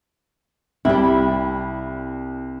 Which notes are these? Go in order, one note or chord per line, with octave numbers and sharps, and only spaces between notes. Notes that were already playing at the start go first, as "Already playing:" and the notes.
C2 G3 E4